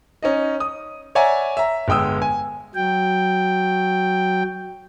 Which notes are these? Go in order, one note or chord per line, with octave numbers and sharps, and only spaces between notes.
C#4 D#4 D#5
D#6
C#5 D5 E5 F#5 G#5 A#5
E5 A#5
G1 G#3 G5 D#6 E6
G#5
F#3 G5